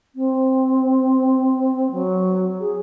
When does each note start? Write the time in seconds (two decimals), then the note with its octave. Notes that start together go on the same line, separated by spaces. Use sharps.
0.15 C4
1.91 F#3
2.60 G#4